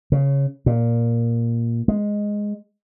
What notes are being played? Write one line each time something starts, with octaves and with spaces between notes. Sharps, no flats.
C#3
A#2
G#3